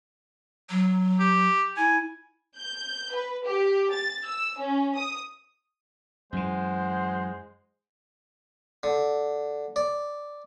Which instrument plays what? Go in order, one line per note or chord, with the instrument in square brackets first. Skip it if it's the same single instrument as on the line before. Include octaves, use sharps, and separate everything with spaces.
[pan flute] F#3
[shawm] G4
[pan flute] E4 [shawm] G#5
[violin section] G6
B4
G4
A6
E6
C#4
D#6
[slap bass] F#2 E3 [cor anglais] G#3 [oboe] C5 [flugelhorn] F#5
[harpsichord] D3
D5